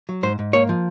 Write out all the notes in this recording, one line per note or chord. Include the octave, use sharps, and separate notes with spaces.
F#3
G#2 C5
G#2
A#3 C#5
F3